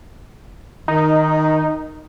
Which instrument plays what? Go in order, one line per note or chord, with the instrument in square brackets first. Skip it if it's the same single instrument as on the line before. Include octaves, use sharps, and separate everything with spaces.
[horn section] D#3 [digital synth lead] D#4